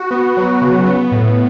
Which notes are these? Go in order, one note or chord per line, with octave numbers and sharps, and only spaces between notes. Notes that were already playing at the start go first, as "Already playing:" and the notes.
Already playing: F#4
B3
F#3
C#3
B3
A2